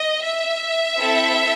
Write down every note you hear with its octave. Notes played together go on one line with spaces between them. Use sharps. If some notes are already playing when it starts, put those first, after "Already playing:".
Already playing: D#5
E5
C4 E4 A4